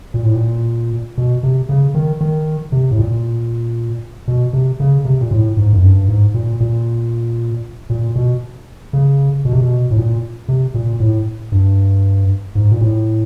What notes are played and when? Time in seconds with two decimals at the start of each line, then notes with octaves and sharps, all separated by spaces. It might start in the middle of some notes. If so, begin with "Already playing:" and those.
0.14 A#2
0.24 A2
0.35 A#2
1.18 B2
1.43 C3
1.69 C#3
1.95 D#3
2.21 D#3
2.72 C3
2.91 A2
2.99 A#2
4.28 B2
4.53 C3
4.80 C#3
5.05 C3
5.21 A#2
5.31 A2
5.57 G#2
5.73 F#2
5.83 G2
6.09 G#2
6.34 A#2
6.61 A#2
7.90 A#2
8.16 B2
8.93 C#3
9.45 B2
9.53 C3
9.61 B2
9.91 A2
9.97 A#2
10.49 C3
10.75 A#2
11.00 A2
11.52 G2
12.55 G#2
12.72 A#2
12.81 A2